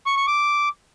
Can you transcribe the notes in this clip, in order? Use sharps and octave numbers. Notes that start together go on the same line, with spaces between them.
C#6
C#6
D6